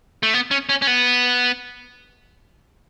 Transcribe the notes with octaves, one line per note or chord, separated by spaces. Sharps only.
A3
B3
C#4
C#4
C#4
B3